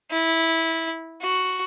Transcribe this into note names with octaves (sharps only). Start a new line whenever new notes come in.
E4
F#4